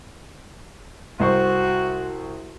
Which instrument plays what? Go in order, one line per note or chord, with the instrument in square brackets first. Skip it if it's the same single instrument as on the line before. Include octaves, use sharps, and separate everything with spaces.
[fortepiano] C2 C5 C#6 [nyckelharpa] F#4